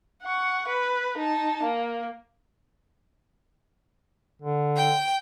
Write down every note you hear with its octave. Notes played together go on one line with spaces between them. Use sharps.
F#5 C#6
B4
D#4 A5
A#3
D3
G5